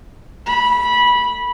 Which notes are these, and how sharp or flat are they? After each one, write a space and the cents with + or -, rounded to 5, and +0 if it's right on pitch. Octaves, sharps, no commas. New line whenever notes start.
A3 +25 B5 -15